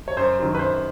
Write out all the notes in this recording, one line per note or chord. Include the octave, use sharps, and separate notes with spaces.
C#5
F#2 C5
D#3 F#3
B4
F#2 C5